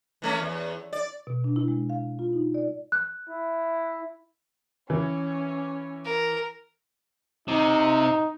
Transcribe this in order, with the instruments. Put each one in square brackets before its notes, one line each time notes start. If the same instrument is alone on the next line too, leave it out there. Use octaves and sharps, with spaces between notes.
[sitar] E3 A3 C#4
E2
D5
[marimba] B2
D4
E4
G#3
F5
F4
D#4
D5
[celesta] F#6
[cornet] E4
[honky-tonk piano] E3 [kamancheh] C#4
[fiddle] A#4
[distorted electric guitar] C3 [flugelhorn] D#4